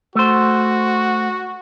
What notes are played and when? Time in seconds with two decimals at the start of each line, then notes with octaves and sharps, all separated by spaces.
0.15 A3 F#4 C5